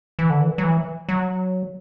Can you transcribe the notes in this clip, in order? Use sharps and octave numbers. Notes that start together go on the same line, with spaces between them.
E3
D3
E3
F#3
E3
F#3